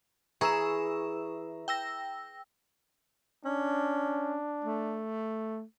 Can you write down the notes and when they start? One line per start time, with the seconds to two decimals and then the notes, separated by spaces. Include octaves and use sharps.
0.41 E3 G#4 A#5 C#6 E6 E7
1.68 G5 E6 A#6
3.45 C#4 D4
4.65 A3